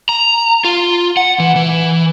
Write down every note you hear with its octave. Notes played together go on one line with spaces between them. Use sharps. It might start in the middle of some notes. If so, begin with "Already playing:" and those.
A#5
F4
F#5
E3
E3